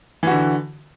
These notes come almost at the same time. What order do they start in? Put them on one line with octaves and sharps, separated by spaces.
E3 F#4 D3